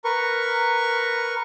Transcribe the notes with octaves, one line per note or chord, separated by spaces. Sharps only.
A#4 B4 C#6